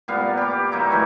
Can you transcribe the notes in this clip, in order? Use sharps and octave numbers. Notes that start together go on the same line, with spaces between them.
A#2 G3 B3 F5
G4 D6
F#3 A#3 D#4 E4
B2 E3 A3